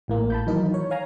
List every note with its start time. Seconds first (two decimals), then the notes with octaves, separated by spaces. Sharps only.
0.08 A1 A2 A#3
0.30 A5 B5 G6
0.47 D#3 E3 F#3 D#4 A#4
0.74 C#5
0.91 C#5 F5 G#5 A#5